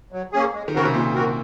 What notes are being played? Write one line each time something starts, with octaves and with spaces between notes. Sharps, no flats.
F#3
A#3 C#4 G#4
G#3
D#3
C#3 C4 F#4 A#4
C3
A#2 G#3
C4 F#4 A#4